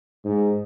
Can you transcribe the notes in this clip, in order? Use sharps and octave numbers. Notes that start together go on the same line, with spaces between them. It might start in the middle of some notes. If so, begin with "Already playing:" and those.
G#2